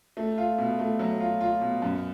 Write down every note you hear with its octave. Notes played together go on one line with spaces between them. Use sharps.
A3
F4
B2
A3
F#3
F4
F4
B2
F#2